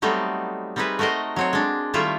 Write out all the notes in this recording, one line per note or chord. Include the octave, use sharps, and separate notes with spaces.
F#3 G3 A3 B3 C4 D#4
G3 C4 D#4 G#4 B4 E5
A3 F#4 A#4 C5 D#5
F#3 C4 C#5
G#3 D4
D#3 G3 A3 E4 F4 E5